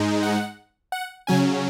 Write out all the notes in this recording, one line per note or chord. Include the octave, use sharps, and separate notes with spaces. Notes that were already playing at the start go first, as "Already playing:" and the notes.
Already playing: G#2 G#3 D#4
F#5
F#5
C#3 F#3 C#4 G#5